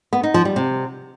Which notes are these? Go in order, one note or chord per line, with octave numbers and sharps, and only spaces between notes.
B3
D#4
F3
G3
C3